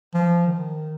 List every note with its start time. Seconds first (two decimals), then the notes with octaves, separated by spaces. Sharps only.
0.14 F3
0.47 D#3